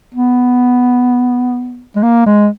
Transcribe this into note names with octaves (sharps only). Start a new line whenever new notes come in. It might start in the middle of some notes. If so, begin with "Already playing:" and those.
B3
G#3
A#3
G#3